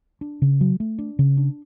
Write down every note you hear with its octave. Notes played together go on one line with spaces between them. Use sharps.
D4
C#3
F#3
A3
D4
C#3
D4